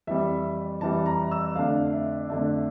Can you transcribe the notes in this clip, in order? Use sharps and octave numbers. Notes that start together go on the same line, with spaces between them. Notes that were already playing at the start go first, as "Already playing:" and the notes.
F2 E3 G3 E5
F2 E3 G3 A5
A#5
E6
F2 D3 A3 D4 F5
E5
F2 D3 A3 D4 E5